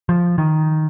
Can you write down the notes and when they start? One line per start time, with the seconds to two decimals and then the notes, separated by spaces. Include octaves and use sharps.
0.09 F3
0.38 D#3